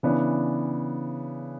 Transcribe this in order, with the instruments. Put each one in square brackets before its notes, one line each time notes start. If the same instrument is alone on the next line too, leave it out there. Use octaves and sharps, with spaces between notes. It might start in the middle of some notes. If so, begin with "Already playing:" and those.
[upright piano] C#3 E3 B3 D4